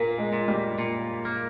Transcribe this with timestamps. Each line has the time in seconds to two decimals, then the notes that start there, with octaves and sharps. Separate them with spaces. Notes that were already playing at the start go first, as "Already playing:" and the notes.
Already playing: A#2 A#3
0.18 G#3
0.33 A#2
0.48 G3
0.78 A#2
1.25 A#3